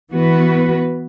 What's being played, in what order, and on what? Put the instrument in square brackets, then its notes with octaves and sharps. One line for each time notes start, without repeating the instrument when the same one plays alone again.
[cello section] E3 B3 F#4 B4